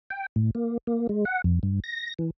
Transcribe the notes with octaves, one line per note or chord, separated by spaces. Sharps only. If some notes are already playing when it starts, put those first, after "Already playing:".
G5
A2
A#3
A#3
G#3
F#5
F2
G2
A#6
E3